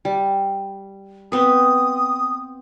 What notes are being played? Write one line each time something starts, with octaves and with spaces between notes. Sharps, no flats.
G3
B3 C4 B4 D#6